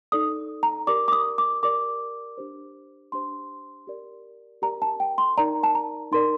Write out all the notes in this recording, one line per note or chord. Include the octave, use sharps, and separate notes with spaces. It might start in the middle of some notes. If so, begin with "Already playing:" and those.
D#4 A4 D5 D#6
A#5
G4 A#4 D5 D6
D6
D#6
D6
G4 A#4 D5 D6
D4 G4 C5
D4 G4 C5 C6
G4 A#4 D5
G4 A#4 D5 A#5
A5
G5
C6
D#4 A#4 D5 A#5
A5
A#5
D#4 A#4 D5 C6